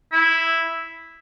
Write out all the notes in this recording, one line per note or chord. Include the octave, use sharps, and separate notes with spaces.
E4